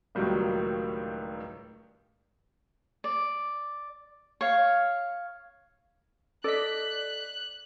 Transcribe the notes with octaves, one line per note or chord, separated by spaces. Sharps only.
C#2 A2 D#3 F#3 G3 A#3
D5
C#5 F5
A4 D5 D#5 F#6 B6